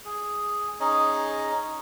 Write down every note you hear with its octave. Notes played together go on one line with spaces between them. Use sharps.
G#4
C#4 D#4 G#4 D#5